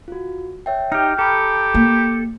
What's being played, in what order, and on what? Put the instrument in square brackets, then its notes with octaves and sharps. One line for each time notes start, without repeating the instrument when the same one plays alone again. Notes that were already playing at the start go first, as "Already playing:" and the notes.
[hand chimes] F4 F#4
C#5 E5 G5
[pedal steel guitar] D#4 G4 [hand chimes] G5 F6 G6
[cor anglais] G4 [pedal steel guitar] A4 [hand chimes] A#5 B5 D#6
[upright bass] A#3